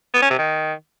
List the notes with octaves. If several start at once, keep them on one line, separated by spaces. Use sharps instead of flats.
B3
C#4
C3
D#3